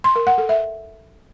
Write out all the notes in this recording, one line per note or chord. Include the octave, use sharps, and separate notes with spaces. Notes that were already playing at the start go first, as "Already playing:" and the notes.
C6
A#4
F#5
A4
E5